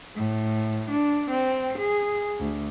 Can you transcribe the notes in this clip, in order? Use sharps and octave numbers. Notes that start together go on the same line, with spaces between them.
A2
D4
C4
G#4
D2